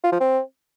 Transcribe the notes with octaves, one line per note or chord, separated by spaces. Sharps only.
F4
F3
C4